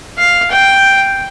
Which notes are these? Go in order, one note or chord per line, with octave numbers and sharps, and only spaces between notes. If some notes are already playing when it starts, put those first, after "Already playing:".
F5
G5